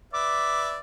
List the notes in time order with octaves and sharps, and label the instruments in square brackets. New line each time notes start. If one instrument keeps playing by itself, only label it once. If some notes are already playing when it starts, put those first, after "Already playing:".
[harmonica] B4 D5 E5 [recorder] D6